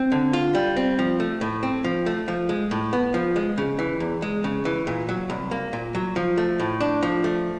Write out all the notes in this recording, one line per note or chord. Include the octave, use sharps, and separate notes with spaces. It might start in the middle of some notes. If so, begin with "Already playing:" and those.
Already playing: C4
D3
F4
G3
C4
F3
A3
A2
C4
F3
A3
F3
G#3
A2
B3
F3
G#3
C#3
E3
E2
G#3
C#3
E3
A#2
F#3
C2
A#3
A#2
F#3
F3
A3
A2
D4
F3
A3